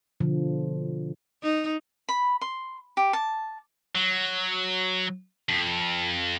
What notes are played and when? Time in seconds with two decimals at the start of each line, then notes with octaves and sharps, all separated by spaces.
0.20 B2 D3 F3
1.42 D#4
2.09 B5
2.41 C6
2.97 G4
3.13 A5
3.95 F#3
5.49 F2